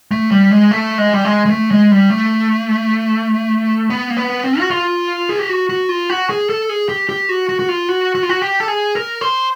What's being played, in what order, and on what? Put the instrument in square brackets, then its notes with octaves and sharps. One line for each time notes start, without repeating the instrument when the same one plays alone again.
[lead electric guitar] A3
G3
G#3
A3
G#3
G3
G#3
G#3
A3
G#3
G3
A3
B3
A#3
B3
C4
F#4
F4
G#4
G4
F#4
F#4
F4
F#4
G#4
A4
G#4
G4
G4
F#4
F#4
F#4
F4
F#4
F#4
F4
F#4
G4
A4
G#4
A#4
C5